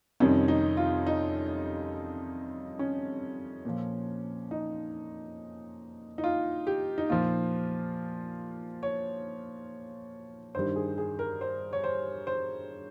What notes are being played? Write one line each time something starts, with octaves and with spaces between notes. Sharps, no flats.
F2 C3 D#3 G3 C#4
D#4
F4
D#4
C#4
A#2 F3
D#4
D#4
F4
G4
D#4
A#2 F3 F4
C#5
G2 D#3 G3 C5
G#4
G#4
A#4
C5
C#5
C5
C5